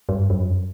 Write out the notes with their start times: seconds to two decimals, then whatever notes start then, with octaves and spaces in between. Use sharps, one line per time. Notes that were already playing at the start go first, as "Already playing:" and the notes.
0.09 G2
0.30 F#2